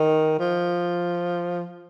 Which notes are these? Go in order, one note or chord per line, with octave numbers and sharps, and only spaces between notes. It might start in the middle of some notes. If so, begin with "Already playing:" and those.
Already playing: D#3
F3